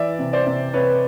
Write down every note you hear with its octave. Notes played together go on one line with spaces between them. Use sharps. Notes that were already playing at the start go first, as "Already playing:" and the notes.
Already playing: E3 D5 E5
C3
C5 D5
C3
C3 B4 C#5